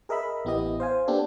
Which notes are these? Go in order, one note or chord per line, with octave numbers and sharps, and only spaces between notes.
G#4 A#4 D#5 E5 B5
A1 B3 E4 G4 D#5
C5 F5 G#5
A#3 B3 D4 G4 A4